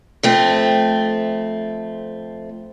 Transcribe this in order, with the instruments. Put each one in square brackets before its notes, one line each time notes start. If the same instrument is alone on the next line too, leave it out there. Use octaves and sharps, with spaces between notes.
[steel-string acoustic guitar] F2 A3 C4